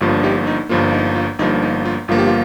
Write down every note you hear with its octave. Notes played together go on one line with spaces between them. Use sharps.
G1 G2 F3 A#3 F4
D#4 G4
D#4
G1 G2 F3 A#3 F4
D#4
F4
G1 G2 F3 A#3 D#4
D#4
F4
G1 G2 F3 A#3 F4
G4
F4